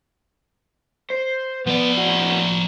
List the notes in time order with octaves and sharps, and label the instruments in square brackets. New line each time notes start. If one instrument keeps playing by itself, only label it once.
[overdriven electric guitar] C5
[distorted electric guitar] F3 D5 [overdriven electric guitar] B3
[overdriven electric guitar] A2 F#4